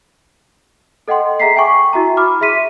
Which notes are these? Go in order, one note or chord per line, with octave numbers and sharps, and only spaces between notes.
A4 D#5 F#5 G5 C6
G#4 E5 A#5 B6 C7
G5 G#5 C#6 D6
E4 F#4 E5 A#5
B5 D6 F6
G#4 E5 C6 B6 D#7